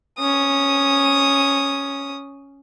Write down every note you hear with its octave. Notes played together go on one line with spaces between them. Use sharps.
C#4 D#6